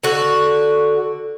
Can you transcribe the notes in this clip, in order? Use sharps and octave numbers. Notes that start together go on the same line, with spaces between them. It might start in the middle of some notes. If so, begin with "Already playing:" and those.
D3 F#4